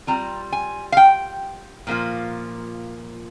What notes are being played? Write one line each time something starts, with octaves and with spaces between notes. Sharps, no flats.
G3 C4 F4 A#5
G#5
F5
G5
A#2 F3 A#3 F4